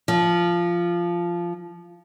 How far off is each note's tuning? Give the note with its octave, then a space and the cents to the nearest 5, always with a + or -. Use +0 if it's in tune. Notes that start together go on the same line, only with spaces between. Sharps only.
F3 -10